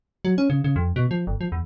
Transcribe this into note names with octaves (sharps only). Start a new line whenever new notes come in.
F#3
C#4
C#3
C#3
F2
B2
F3
G1
F3
E2